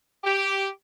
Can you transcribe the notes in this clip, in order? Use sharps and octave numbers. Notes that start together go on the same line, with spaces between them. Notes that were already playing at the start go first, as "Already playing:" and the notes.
G4